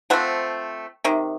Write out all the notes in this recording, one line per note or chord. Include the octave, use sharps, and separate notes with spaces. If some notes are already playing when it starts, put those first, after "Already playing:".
F3 A3 C4 F#5
C3 D#3